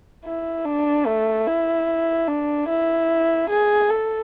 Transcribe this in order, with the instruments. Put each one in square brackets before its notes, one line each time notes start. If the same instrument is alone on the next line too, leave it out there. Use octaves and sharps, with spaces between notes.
[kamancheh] E4
D4
A3
E4
D4
E4
G#4
A4